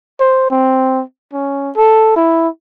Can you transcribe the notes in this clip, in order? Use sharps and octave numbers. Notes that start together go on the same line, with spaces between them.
C5
C4
C#4
A4
E4